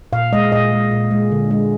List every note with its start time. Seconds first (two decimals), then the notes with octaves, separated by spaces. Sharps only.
0.13 A#2 F5
0.33 G#3 D#5
0.52 A#2 D#5
0.72 G#3
0.91 A#2
1.11 G#3
1.31 D3
1.51 G#3